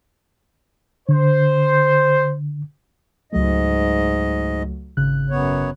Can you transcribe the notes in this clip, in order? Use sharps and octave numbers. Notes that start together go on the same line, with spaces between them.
D3 C5
C#2 G#2 F#3 A3 D#5
G#1 C#3 F#6
F#2 B3 C#5